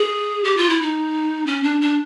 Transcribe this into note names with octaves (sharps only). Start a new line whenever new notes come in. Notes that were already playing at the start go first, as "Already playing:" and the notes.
Already playing: G#4
G4
F4
E4
D#4
C#4
D4
D4